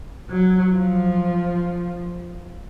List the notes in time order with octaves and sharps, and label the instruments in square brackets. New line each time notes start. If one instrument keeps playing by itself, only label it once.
[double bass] F#3
F3